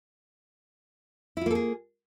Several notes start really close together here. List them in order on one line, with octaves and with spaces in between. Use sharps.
E4 F4 A#3 A4 G#4